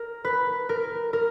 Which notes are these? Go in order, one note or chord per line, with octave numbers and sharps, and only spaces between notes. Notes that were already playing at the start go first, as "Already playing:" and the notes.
Already playing: A#4
B4
A#4
A#4